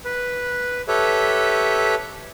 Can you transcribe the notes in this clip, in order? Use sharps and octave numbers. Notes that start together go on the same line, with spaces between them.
B4
G4 A4 B4 C#5 E5